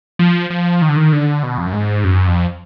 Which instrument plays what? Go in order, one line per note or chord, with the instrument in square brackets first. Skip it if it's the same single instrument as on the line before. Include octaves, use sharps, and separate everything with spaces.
[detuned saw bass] F3
F3
D#3
D3
D#3
D3
B2
F2
F#2
G#2
F#2
F2